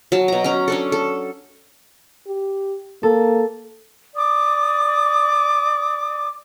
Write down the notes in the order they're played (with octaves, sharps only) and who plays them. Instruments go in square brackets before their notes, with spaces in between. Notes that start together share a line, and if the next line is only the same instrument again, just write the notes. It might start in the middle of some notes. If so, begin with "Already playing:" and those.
[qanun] F#3 A5
B2 A#5
C#4 A#5
C#4 D4 A4
A4
[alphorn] G4
[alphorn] A#3 [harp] A4
[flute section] D5 D6 D#6